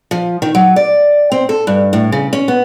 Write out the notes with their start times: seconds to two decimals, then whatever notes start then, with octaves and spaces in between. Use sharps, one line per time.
0.11 F3
0.42 D#3
0.55 F#3
0.76 D5
1.32 C4
1.49 A4
1.67 G2
1.93 A2
2.12 C#3
2.33 C#4
2.48 B3